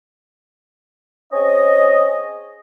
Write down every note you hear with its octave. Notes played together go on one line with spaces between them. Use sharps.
C4 C#4 G#4 C#5 D#5